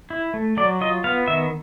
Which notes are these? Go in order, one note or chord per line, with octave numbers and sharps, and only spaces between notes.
E4
A3
F#3 D5
F4 D#5
B3 F5
D#3 E5